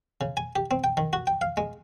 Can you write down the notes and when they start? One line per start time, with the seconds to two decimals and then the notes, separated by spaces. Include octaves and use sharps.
0.21 C#3
0.37 G#5
0.56 G4
0.71 C4
0.84 G5
0.97 D#3
1.13 F#4
1.27 G5
1.41 F5
1.57 G#3